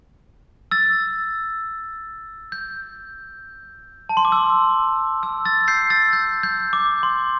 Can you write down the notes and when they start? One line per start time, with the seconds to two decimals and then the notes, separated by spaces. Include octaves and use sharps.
0.71 E6 A6
2.52 G6
4.09 A5
4.17 C6
4.25 D6
4.32 E6
5.23 E6
5.45 E6 A6
5.68 G6 C7
5.90 E6 A6
6.13 G6
6.43 G6
6.73 D6
7.03 C6